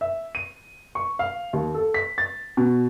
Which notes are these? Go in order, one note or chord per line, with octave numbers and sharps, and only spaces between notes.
E5
D#7
C#6
F5
D#2
A4
B6
A6
B2